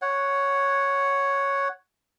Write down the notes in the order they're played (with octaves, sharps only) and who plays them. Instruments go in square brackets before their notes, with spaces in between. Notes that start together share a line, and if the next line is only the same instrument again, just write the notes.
[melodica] C#5 F#5